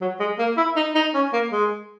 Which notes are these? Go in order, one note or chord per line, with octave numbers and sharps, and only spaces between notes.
F#3
G#3
A#3
E4
D#4
D#4
C#4
A#3
G#3